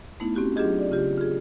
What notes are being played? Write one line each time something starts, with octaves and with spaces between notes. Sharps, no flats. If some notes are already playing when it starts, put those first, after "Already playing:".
A3 B3 D#4 E4
C4 C#4 F#4 G4
F#3 D4 F4 G4 G#4 D#5
D5
C#3 F4 G4
F4 G#4